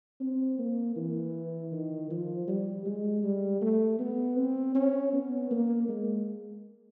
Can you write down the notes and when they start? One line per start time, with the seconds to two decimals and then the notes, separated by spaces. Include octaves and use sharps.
0.21 C4
0.59 A#3
0.96 E3
1.72 D#3
2.10 F3
2.48 G3
2.85 G#3
3.23 G3
3.62 A3
3.99 B3
4.37 C4
4.75 C#4
5.13 B3
5.51 A#3
5.88 G#3